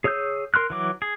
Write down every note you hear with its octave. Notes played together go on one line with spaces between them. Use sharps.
G#4 C#5 D#6 E6 G6
A#4 C6 F6 F#6
E3 F#3 D6
G#4